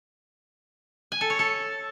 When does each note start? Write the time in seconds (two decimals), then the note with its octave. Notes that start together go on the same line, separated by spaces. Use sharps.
1.12 G#5
1.21 A4
1.30 C#5
1.39 A4